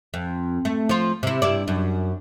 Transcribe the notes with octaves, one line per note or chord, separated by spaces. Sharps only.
F2
A3
F3 F4
C3 E4
G2 E4 D5
F#2